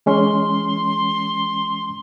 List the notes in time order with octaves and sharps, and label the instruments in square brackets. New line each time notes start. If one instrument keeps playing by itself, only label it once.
[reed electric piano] E3 G#3 C#4 [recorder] C6